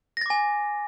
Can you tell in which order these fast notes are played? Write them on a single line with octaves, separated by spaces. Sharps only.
A#6 A6 D6 G#5